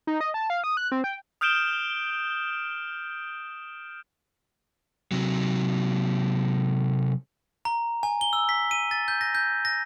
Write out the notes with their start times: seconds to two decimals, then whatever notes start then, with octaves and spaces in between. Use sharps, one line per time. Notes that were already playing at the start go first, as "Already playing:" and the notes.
0.07 D#4
0.21 D#5
0.34 A5
0.50 F5
0.64 D#6
0.77 F#6
0.92 C4
1.04 G5
1.41 D#6 F6 G6 D7 E7 G7
5.12 C3 F#3
7.65 A#5
8.03 G#5
8.21 G7
8.33 E6
8.49 B6
8.71 D#7
8.91 A6
9.08 G6
9.21 A#6
9.35 G6
9.65 A#6